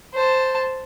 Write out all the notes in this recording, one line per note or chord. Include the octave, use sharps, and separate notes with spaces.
C5 A5